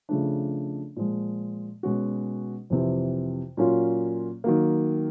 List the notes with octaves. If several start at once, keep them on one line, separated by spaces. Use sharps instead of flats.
C#3 F3 A3 D4
A#2 F3 G#3
B2 G#3 C#4 F#4
F2 C3 E3
A#2 F#3 A#3 C#4 F4
D#3 F#3 A#3